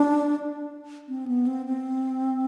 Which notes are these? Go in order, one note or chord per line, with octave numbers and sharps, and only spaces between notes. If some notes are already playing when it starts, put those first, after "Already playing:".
Already playing: D4
C4
B3
C4
C4